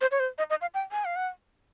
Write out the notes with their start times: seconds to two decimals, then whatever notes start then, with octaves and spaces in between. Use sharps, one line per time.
0.01 C5
0.11 C#5
0.20 C5
0.38 D#5
0.50 D#5
0.61 F5
0.74 G5
0.92 G#5
1.05 F5
1.16 F#5